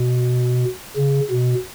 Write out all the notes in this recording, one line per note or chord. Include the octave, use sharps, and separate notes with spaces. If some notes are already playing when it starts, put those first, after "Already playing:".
Already playing: B2
C#3
B2